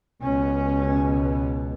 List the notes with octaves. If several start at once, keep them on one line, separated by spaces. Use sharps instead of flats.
C#2 B2 C#4